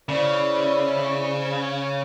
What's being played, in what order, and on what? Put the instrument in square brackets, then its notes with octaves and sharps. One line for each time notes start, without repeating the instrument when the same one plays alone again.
[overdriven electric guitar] C#3 [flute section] E4 C5 D5